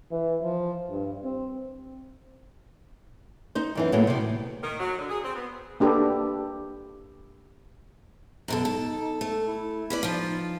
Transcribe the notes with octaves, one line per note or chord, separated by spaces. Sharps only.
E3
F3
G2
C4
D#4 C5
F#2 E3 C4
A2 F#3 G#3 A#3 B3
C3 D#3
D#3
F#3
D3
G#4
C4
B3
A#3 D4 G4 A4 B4
F#2 B2 A4
D#4 A4
A3 A4
E4
C#4 B4 D5
F3 D#4 F4